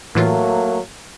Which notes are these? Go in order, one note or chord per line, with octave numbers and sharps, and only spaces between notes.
A2 E3 F#3 A3 A#3 F4